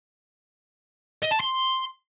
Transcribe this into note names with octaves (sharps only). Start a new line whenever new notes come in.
D#5
A5
C6